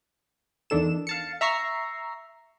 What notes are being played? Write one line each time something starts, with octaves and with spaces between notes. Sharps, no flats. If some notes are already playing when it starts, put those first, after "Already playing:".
E2 D#3 D4 A4 E7
F5 A5 C#7
E5 A#5 C#6 C7